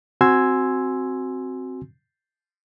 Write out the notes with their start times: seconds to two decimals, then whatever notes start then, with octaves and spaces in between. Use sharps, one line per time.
0.21 C4 F#4 G#5 C6 E6 G#6